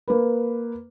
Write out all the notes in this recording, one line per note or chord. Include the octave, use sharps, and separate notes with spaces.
A#3 B4